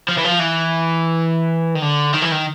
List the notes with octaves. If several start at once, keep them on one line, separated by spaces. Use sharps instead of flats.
F3
E3
F3
E3
D#3
D3
D#3
E3
D#3